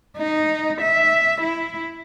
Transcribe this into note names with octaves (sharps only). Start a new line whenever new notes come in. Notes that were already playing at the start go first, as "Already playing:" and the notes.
D#4
E5
E4